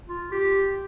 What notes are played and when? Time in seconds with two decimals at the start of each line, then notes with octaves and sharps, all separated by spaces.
0.09 F4
0.32 G4